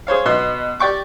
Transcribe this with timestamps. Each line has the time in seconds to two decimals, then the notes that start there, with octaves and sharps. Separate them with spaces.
0.07 G#4 C5 C#5 F5
0.26 B2 B3 D#4 C6
0.80 G4 D5 G5 C#6 D6